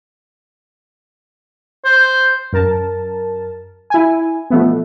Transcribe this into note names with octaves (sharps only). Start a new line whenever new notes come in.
C5
F#2 A#4 A5
E4 G#5
B2 F3 A3 B3